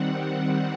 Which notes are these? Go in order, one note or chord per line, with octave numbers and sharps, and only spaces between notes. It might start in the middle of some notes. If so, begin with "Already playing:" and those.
Already playing: D#3 G3 C4 F#5